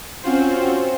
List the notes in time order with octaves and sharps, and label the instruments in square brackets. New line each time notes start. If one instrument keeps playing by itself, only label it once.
[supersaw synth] C4 C#4 F4 F#4 C5